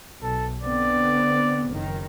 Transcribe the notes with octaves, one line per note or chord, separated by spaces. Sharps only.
B1 A4
D3 B3 C4 D5
F#1 D#3